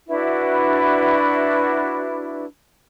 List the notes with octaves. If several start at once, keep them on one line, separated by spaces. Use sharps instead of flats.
D4 E4 F#4 B4